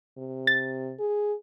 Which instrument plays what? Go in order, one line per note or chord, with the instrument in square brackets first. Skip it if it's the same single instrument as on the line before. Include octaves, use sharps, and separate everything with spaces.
[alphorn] C3
[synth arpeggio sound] A6
[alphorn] G#4